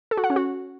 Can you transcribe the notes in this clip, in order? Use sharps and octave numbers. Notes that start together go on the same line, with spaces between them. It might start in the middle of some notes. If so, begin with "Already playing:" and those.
A4
F#4
F#5
C#4
F#4